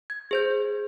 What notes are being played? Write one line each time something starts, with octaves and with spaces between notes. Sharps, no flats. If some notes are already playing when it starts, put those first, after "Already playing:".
G#6
G#4 C5 G6